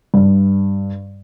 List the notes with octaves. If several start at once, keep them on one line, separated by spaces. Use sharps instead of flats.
G2